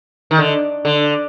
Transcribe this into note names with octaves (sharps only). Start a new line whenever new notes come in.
D#3
D3
D3